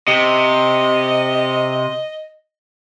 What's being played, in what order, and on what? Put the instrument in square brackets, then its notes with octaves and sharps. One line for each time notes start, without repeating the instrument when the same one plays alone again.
[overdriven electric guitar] C3 [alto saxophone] D#5